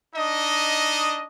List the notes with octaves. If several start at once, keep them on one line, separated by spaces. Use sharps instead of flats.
D4 D#4 D#5